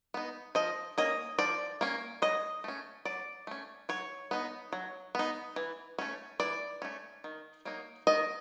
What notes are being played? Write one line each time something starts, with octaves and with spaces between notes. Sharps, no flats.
B3 D#4
F3 D#5
A#3 C#4 D#5
F3 D5
A#3 C#4
F#3 D#5
A3 C#4
F#3 D5
A3 C#4
F#3 C#5
B3 D#4
F#3
B3 D#4
E3
A3 C#4
E3 D5
A3 C#4
D#3
F#3 A#3 D#4
D#3 D#5